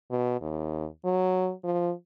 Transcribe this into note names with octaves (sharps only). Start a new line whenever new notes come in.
B2
D#2
F#3
F3